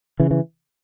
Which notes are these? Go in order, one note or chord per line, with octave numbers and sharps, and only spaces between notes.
C#3 E3
E3